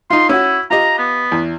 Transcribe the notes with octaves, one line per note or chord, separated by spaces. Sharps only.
D#4 F4 C6
C#4 E4 F#4
F4 G4 D#5 A#5
B3
E2